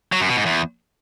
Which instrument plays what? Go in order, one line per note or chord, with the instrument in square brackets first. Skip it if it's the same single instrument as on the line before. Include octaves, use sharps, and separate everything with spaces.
[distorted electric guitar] F#3
F#2
B2
G#2
E2